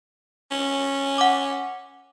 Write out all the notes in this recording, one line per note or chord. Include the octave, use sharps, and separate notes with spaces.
C#4
F#5 D6